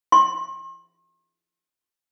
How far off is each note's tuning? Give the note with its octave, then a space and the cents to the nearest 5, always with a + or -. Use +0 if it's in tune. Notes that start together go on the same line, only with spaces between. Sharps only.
C6 +40